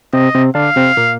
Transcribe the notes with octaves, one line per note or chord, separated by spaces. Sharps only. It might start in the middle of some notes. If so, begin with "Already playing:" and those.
C3 C4 D#5
C3 C4
D3 D4 F5
C3 C4
A#2 A#3